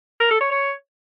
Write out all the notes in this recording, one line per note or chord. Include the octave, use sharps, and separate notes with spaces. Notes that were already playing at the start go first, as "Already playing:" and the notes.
A#4
A4
C#5
C#5